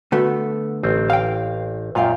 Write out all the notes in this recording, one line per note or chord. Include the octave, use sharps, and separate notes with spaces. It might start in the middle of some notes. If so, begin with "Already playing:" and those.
D3 A3 B3 F#4
A1 C4
F5 G5
F#2 A#2 F4 F5 G5